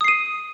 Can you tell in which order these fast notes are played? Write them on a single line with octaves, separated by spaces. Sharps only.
D#6 C7 D#7